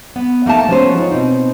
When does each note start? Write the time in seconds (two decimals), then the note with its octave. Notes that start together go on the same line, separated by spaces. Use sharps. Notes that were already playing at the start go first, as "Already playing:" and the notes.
0.16 B3
0.46 A3 A#3 D#4 A5
0.68 F3 G#3 B3 C#4 F#4 C5
0.98 D#4 F4 C#5
1.11 B2 C4 D#4